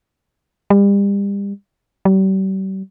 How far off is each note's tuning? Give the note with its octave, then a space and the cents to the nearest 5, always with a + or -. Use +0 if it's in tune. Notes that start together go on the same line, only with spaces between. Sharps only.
G3 +35
G3 -40